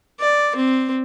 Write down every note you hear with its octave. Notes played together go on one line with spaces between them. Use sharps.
D5
C4